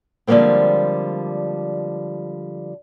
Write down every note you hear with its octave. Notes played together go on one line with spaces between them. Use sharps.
D3 F3 G3 G#3 A#3 C4